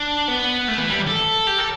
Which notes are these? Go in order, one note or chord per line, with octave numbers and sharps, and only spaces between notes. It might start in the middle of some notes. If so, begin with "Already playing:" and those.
Already playing: D4
B3
A3
E3
G3
A4
G4
A4